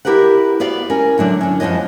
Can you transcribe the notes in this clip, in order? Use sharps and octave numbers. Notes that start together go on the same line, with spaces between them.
E4 G4 A#4 B4 F#5
B3 F#4 D5 F5
C#4 A#4
A2 D3 F#3 D4
C#4 D4
F#2 F3 B3 C#5 D#5